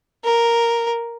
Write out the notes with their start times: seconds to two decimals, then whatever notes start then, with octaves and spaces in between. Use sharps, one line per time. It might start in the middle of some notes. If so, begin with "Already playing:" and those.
0.24 A#4